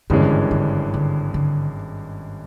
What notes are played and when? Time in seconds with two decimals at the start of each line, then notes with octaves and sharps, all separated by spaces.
0.10 G#1 G2 D3 E3 G#3 C#4
0.51 D3
0.94 D3
1.34 D3